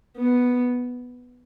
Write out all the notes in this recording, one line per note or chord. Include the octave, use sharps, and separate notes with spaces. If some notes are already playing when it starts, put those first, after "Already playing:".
B3